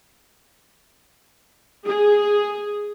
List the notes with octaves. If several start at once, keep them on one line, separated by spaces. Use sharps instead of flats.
G#4